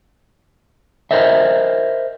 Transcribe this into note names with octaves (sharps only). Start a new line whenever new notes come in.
A#4 C5 D#5 E5